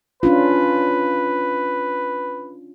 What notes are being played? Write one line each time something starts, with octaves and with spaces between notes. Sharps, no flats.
C#4 D4 F4 B4